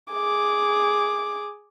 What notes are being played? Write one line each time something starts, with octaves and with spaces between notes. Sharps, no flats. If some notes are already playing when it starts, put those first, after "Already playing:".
G#4 D6